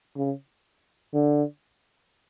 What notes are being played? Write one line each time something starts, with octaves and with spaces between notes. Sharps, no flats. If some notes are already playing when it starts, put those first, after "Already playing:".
C#3
D3